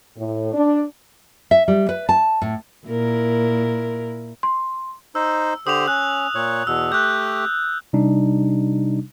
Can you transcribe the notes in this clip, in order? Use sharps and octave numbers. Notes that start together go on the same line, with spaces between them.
A2
D4
E5
G3
B4
A5
A2
A#2 E4 A#4
C6
D#4 C5 E6
D3 G4 C5 D#6 F7
C#4 F#6
A#2 C#5
E2 B2 E6
A3 G4 F#6 G6
C3 G3 D4 D#4